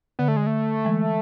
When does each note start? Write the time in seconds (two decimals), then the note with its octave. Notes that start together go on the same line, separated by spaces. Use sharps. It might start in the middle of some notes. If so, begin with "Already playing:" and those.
0.19 D3 B3
0.28 A3
0.37 G#3
0.47 A3
0.85 E3 G#3